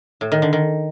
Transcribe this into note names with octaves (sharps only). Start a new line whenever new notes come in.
A2
D#3
D3
D#3